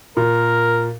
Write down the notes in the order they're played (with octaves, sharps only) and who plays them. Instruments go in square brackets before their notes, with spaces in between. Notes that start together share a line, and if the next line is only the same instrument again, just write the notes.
[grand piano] A#2 [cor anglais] A#4